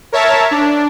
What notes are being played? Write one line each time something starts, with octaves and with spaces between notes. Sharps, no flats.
A#4 C#5 E5 A5
D4